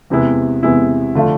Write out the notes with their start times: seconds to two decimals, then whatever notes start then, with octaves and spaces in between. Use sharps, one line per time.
0.10 E2 C3 G#3 B3 E4
0.63 E2 C3 G#3 B3 E4
1.15 D3 F3 A3 D4 F4